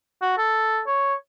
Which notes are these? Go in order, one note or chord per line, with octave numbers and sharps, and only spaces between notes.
F#4
A4
C#5